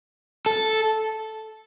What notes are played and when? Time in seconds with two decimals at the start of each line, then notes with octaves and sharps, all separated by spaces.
0.46 A4